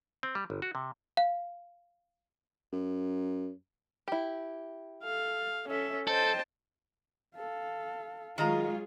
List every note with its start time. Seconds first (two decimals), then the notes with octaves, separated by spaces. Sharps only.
0.23 C4
0.35 G3
0.50 G1
0.62 F#4
0.75 C3
1.17 F5
2.72 F#2
4.08 E4 G4
5.04 A4 F5
5.68 C#4 A4 E5
6.08 A4 C5 D#5 G5 A5
7.36 A4 F5
8.38 D#3 F#3 G#3 F4 G#4 D#5 A#5